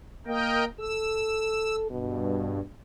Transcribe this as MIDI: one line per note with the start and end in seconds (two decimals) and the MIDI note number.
0.27 0.66 58
0.27 0.65 70
0.27 0.65 75
0.27 0.65 79
0.80 1.89 69
0.80 1.76 88
1.90 2.60 43
1.90 2.67 47